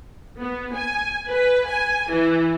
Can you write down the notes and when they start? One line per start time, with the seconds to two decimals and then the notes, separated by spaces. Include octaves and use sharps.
0.40 B3
0.75 G#5
1.29 B4
1.68 G#5
2.11 E3